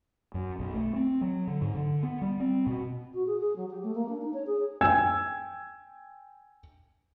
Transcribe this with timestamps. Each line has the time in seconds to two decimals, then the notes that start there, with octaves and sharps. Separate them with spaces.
0.34 F#2
0.59 B1
0.73 A3
0.96 C4
1.21 F#3
1.47 D3
1.61 G#2
1.74 D3
2.03 B3
2.22 G3
2.40 C4
2.66 B2
3.14 F#4
3.27 G#4
3.40 G#4
3.56 F#3
3.70 G4
3.83 A3
3.95 A#3
4.09 D4
4.22 D#4
4.34 C#5
4.47 G#4
4.81 G5 G#5 E6 G#6